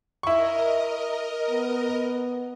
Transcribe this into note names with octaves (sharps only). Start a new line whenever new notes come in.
E4 A#4 D#5 C#6
B3